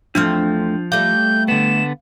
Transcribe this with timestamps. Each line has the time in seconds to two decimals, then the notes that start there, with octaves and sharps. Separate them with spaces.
0.15 E2 F3 A3 C4 D4 F6
0.92 G3 A3 F5 G6
1.48 D3 B3 E7